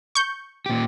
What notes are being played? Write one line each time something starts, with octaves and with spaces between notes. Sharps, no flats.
C#6 G6
A#2 G4